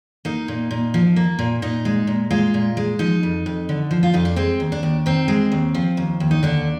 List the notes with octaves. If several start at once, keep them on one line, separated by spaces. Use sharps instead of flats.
A#3 D#4
A#2
A#2
F3
A#3
A#2
A#2 D#4
G#3
A#2
G#3 F4
A#2
G#3
F3 D#4
F2
F2
D3
F3
F4
F2 D#4
D4
G#3 C4
D#2
D4
D#2
D#3 C4
G#3
D#2
F3
D#2
D#2
D#4
D3 D4